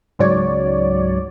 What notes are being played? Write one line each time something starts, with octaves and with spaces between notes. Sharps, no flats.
C#2 G#2 C#3 F#3 C#5 D5